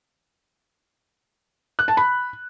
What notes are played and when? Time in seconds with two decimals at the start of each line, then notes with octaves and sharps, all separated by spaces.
1.79 F#6
1.88 A5
1.97 B5